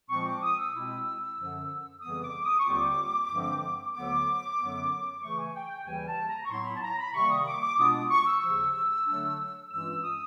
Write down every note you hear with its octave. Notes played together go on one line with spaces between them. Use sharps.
A#2 F3 G#3 C4 C#6
D6
D#6
E6
B2 G#3 C4 E4
F#2 D3 F3
F2 C#3 E3 G3 B3 D#6
D6
D#6
C#6
D#2 D3 G3 C4 F4 D6
G2 D3 F3 G#3 C4
D2 D3 F#3 B3 D6
F#2 D3 F#3 B3
C#3 E3 A3 C#6
G#5
G5
G5
D#2 C#3 E3 G3 G#5
A5
A#5
C#6
A2 F#3 B3 E4 C6
B5
A5
A#5
B5
C3 D#3 G3 A#3 C#6
D#6
D6
D6
B2 G#3 B3 D4 F4 D#6
D#6
C#6
E6
D#2 C#3 F3
D3 F#3 A3 D4
G2 E3 G#3 C#4 F4 E6
D#6